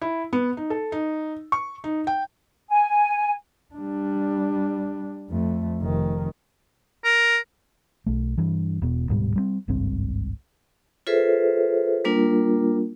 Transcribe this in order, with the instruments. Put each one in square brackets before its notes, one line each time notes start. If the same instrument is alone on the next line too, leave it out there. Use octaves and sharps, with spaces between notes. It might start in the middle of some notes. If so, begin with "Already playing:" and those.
[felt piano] E4
B3
D#4
A4
D#4
C#6
D#4
G5
[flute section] G#5
[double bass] G3 D4
F2 A3
F1 D#3
[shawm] A#4
[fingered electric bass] B1 A3
G2 E3
E1 B2
D1 G#2 B2 G3
G3 G#3 C4
G#1 C#2 G2 C4
[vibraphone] F4 G#4 A4 B4 C5 E5
G3 A#3 D4 F4 A#4